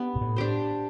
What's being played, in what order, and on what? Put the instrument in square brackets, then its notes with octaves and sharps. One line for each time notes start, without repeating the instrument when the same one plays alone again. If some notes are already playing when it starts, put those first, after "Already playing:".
Already playing: [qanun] B3 D4 G4
[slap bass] B2
A2
[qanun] D4 G4 C5